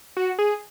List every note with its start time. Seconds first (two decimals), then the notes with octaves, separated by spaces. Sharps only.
0.17 F#4
0.39 G#4